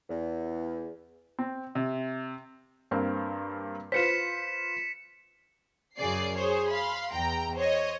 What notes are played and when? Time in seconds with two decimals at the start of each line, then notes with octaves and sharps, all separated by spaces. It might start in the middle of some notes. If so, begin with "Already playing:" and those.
0.09 E2
1.39 C4
1.75 C3
2.91 G2 A#3 C4
3.92 F4 B4 C5 B6 C#7 E7
5.97 F#2 C#3 G#4 D5 C7
6.36 G#4 C5 C#5
6.69 F5 B5 C6
7.12 E2 G5 A#5
7.56 C5 C#5 D#5